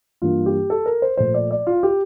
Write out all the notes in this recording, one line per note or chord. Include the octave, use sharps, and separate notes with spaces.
G2 E3 G3 A#3 F4
G4
A4
A#4
C5
A#2 F3 A3 C5
D5
D5
F4
G4